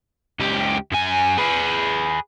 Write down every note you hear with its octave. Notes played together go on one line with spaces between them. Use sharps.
C#2 G4
F#2 G#5
G#4 B4